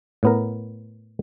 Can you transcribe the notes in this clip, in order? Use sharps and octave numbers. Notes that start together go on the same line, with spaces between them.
A2 B3 A#4